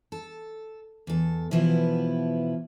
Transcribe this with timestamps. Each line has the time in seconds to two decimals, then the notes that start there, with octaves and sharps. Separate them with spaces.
0.12 A4
1.07 E2 A4
1.51 B2 E3 F3 B3 E4